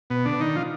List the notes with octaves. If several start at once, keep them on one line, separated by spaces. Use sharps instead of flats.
B2 B3
D3 D4
D#3 D#4
F3 F4